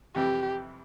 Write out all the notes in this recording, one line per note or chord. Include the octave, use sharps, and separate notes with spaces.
F2 C3 E3 G3 G4